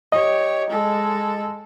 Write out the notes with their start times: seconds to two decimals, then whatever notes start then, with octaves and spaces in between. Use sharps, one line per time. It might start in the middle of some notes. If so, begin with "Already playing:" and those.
0.12 G4 C#5 D#5
0.70 G#3 A4